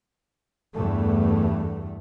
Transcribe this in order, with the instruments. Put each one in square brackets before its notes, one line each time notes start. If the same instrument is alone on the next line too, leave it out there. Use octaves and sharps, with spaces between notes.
[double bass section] E2 G2 A3